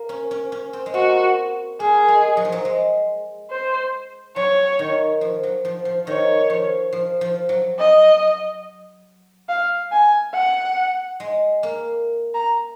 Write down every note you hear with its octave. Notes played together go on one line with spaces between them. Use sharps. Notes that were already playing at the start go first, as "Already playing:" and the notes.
Already playing: A#3
C#4
C#4
C#4
C4
G#3
A#3 F#4
A#3 G#4
G#3
F#3
F3
F#3
G#3
C5
F#3 C#5
D#3
F3
F#3
F3
F3
D#3 C#5
F3
F3
F3
F#3
D#5
F5
G#5
F#5
G#3
A#3
A#5